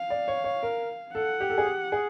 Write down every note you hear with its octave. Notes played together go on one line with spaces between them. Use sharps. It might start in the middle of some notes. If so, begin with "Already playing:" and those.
Already playing: F5
D5
C#5
C#5
A#4
A4 F#5
G4
A4
G#4
G4
G#4